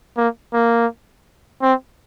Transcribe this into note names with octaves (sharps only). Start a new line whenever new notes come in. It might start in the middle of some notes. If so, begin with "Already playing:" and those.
A#3
A#3
C4